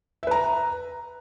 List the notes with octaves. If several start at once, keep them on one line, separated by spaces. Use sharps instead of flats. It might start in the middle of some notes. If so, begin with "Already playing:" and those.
B4 E5 A#5